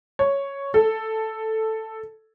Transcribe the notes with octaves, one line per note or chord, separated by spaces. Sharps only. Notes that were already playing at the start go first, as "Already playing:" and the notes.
C#5
A4